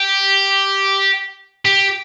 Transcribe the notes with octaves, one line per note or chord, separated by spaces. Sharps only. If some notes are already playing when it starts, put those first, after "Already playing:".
Already playing: G4
G4